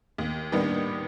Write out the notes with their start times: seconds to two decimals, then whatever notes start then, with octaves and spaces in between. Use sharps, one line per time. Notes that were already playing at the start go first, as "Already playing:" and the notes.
0.18 D#2
0.52 D#3 G3 B3 D4